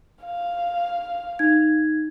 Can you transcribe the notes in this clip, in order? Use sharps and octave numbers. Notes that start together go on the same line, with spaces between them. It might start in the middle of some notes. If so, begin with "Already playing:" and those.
F5
D#4 G#6